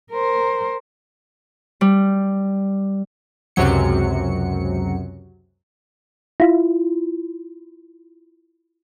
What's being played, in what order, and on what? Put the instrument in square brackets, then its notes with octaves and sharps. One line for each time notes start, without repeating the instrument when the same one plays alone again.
[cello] A#4 C5
[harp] G3
[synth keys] C#2 F#2 C3 F#3 C#7
[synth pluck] E4 F4